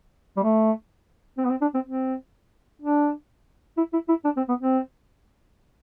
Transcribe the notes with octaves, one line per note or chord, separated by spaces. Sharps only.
G3
A3
C4
B3
C4
D4
C4
C4
D4
E4
E4
E4
D4
C4
B3
C4